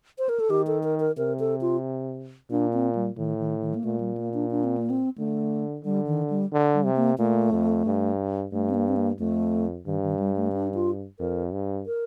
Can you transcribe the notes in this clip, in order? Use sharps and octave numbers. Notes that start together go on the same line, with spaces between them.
C5
A#4
A4
D#3 G4
A4
A#4
A#4
C3 A#4
A4
F4
A#2 D4
C4
G3
A2 D#3
D#3
D#3
A#3
A#2 A3
G3
A#3
D4
D4
C4
A#3
C4
D3 A3
D3 G3
D#3
G3
D3
G3
C3
A#3
A#2 A3
F2
G2
G2 A3
C4
A#3
C4
A#3
F2 A3
G2 D#3
D#3
G3
A3
D4
F4
F2 A#4
G2
A#4